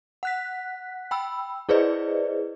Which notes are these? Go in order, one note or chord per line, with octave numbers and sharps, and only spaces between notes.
F#5 F#6 B6
G5 B5 E6
E4 G#4 B4 C5 D5 D#5